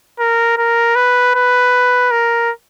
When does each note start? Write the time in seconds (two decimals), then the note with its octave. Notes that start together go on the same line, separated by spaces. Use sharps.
0.20 A#4
0.58 A#4
0.96 B4
1.35 B4
2.11 A#4